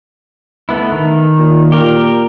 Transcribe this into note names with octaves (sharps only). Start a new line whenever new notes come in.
A3 B3 E4
D#3
A#2
A#2 G4 A#4